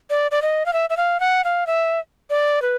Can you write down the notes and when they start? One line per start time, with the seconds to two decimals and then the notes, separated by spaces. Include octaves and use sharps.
0.10 D5
0.31 D5
0.42 D#5
0.66 F5
0.73 E5
0.90 E5
0.97 F5
1.20 F#5
1.44 F5
1.67 E5
2.30 D5
2.62 B4